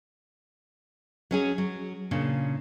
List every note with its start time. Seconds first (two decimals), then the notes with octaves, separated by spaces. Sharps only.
1.31 F#3 C#4 G#4
1.58 F#3
2.11 A#2 C#3 D4